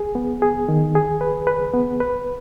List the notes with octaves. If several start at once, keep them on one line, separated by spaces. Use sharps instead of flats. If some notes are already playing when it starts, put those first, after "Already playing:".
Already playing: G#4
B3
G#4
D#3
G#4
B4
B4
B3
B4